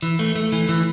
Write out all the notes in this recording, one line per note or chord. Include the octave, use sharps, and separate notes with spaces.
E3
A3
A3
E3
E3